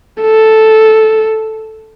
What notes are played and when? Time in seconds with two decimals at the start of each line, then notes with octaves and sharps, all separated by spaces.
0.22 A4